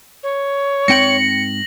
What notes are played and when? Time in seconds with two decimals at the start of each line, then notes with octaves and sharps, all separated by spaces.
0.23 C#5
0.88 G#2 C4 G5 A#6 C#7 F#7